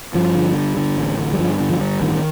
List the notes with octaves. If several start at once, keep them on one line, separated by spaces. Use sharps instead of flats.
G2 F3
D3
G2
D3
A1
D3
G3
G2 F3
D3
F3
G2
A1 D#3